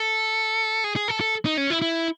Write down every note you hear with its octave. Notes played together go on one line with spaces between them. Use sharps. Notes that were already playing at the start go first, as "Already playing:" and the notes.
Already playing: A4
G#4
G#4
A4
A4
D#4
C#4
E4
E4